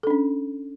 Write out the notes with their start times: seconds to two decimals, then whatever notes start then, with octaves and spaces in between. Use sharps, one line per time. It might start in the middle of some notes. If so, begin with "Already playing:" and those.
0.03 A4
0.07 D4
0.10 C#4